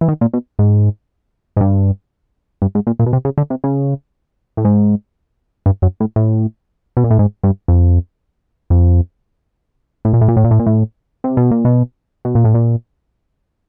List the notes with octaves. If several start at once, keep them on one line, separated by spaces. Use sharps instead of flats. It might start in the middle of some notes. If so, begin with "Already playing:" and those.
E3
D#3
A#2
B2
G#2
G#2
G2
G2
G#2
A#2
A#2
B2
C3
C#3
D3
C3
C#3
A2
G#2
G2
F#2
A2
A2
B2
A#2
A2
G#2
G2
F2
F2
A2
A#2
A2
A#2
A2
A#2
A2
A#2
A2
C3
B2
A#2
B2
B2
A#2
A2
A#2